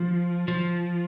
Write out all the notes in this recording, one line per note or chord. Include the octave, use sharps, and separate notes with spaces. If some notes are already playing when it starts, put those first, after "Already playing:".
Already playing: F3
F3